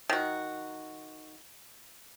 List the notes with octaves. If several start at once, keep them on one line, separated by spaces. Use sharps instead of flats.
D#3 F#4